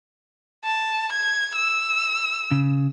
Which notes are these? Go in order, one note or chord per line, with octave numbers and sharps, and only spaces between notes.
A5
G#6
E6
C#3